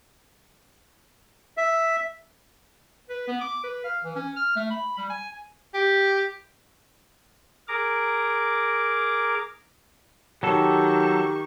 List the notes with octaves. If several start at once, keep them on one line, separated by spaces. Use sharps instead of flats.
E5
B4
B3
D6
B4
F5
E3
C#4
F6
A3
B5
G3
G#5
G4
G#4 A#4 A#5 D6
D#3 F#3 G4 A4 C#6